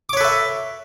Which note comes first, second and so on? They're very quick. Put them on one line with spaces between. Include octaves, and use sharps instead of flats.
D6 C#5 B4 A4 E5